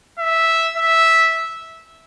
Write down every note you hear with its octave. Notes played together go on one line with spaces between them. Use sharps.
E5
E5